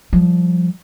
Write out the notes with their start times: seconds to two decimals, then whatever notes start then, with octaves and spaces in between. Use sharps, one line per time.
0.13 F3 G3